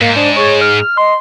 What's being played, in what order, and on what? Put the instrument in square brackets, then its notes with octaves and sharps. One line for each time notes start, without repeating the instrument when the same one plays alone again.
[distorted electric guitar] G#2 [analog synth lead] A#3
[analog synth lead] D4 [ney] C5
[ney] G#4 [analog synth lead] C#5
[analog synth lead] F6
[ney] D#5 [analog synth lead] C6